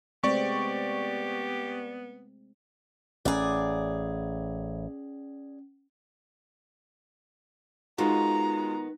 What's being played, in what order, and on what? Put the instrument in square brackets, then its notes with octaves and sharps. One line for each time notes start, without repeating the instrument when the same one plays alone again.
[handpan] G#3 A3 C4 [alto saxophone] B3 [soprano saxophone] G4 [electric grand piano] D5 C#6
[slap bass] A1 [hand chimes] C#4 [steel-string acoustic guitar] G#4 D5
[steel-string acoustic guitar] D#3 B3 [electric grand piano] G#3 F4 F#4 [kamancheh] A#5